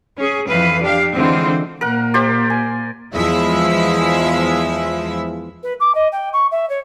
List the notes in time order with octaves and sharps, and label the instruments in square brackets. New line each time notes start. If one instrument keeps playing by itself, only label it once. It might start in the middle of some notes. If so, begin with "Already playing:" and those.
[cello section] C#4 G#4
F2 E3 B4 F5
D4 G4 F5
D3 E3 G#3 C4 F4 C5
[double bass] A#2 A#3 [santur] A#4 F#5
[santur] G4 C5 D5
G#5
[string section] E2 F3 G#3 E4 E5
[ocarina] B4
D6
D#5
G5
C#6
E5
C#5